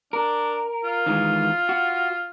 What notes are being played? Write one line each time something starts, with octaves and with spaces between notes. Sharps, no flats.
D4 A#4
F4
D#3 E3 G#3
F#4